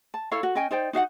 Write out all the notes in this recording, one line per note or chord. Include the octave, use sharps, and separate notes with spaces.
A5
E4 A4 C#5 F5
F#4
C#4 D#5 G5 G#5
D#4 C5 D5 G5
D#4 F#4 F5 F#5